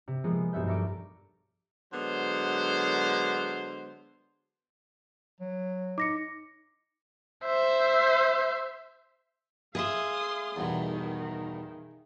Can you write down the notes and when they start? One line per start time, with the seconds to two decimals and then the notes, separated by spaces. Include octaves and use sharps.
0.08 C3
0.24 F3 G#3 A#3 B3
0.53 B1 G2 B3 E5 G6
0.67 A4 A#4 E5 C#6 D6
1.93 D3 F#3 G#3 B3 C5
5.41 F#3
5.98 D#4 D6 A#6 C#7
7.46 C5 E5
9.75 G#4 E5 F5 C6 D#6
10.56 E2 G2 B2 D#3